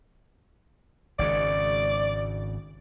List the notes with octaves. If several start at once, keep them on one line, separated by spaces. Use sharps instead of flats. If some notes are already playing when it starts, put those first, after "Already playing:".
G#1 G#2 C#3 D5